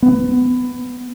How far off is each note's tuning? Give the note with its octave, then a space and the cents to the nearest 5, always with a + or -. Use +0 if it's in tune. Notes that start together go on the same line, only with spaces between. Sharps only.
B3 +15